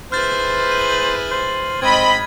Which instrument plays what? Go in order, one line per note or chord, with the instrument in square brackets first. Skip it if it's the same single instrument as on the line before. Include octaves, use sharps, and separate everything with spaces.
[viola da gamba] E4 G#4 B4 [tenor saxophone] C5 [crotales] F6 G6 A6
[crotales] D#7 F#7
[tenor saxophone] C5
[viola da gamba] G#2 [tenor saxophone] C4 [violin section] D#5 B5 [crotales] G#6